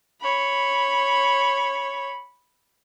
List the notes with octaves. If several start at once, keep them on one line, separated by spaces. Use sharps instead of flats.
C#5 B5